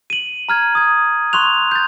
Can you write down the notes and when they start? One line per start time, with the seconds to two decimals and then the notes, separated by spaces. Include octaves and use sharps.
0.10 D#7 F#7
0.49 A#5 F6 G#6
0.75 D#6 G#6
1.33 C6 C#6 F#6 F7
1.71 G6 A6